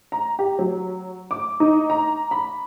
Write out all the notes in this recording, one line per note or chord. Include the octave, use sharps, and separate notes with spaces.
A#5
G4
F#3
D6
D#4
A#5
B5